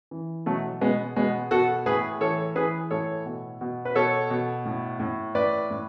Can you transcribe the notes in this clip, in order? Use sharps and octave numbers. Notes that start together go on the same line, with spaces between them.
E3
B2 F#3 A3
B2 G#3 B3
B2 G#3 B3
B2 F#4 A4
A2 G#4 B4
E3 A4 C#5
E3 G#4 B4
A2 A4 C#5
B2
B2
B4
B2 A4 C#5
B2
A2
A2
A2 B4 D5
A2